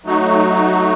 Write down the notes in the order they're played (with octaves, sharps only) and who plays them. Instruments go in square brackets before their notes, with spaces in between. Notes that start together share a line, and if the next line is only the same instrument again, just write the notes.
[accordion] F#3 A3 D#4 F#4